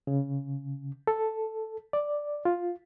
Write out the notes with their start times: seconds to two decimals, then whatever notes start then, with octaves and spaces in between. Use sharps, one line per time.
0.07 C#3
1.07 A4
1.93 D5
2.45 F4